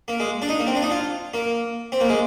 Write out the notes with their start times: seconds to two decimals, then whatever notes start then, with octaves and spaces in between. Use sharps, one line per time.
0.08 A#3
0.20 G#3
0.42 D4
0.49 D#4
0.59 A#3
0.67 C4
0.75 D4
0.82 D#4
0.91 F4
1.34 A#3
1.92 C4
2.00 A#3
2.09 G#3